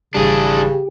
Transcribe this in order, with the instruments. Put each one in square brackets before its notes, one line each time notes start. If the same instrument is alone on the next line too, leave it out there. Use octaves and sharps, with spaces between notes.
[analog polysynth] G#1 E3 G3 [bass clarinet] C#3 [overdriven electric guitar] D4 G#4 [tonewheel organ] G4